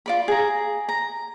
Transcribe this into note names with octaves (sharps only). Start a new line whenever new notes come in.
F4 D5 B5
G#4 A#5
A#5